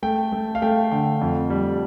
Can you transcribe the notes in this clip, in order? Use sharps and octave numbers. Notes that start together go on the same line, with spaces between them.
A3 G5
A3
F5
A3 G5
D3 G5
F2
G3